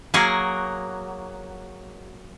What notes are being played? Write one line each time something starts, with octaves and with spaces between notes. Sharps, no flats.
F#3 A#3 F#4 G#4 A#4